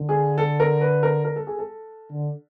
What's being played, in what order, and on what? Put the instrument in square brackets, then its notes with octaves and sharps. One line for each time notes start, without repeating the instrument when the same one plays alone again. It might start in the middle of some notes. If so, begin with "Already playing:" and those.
Already playing: [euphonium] D3
[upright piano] G#4
A4
A#4
B4
A#4
A#4
A4
G#4
A4
[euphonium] D3